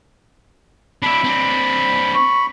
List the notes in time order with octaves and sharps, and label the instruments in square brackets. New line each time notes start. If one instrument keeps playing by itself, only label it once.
[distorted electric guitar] D4 E4 [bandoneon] B5
[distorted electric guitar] C4 D4
[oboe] C#6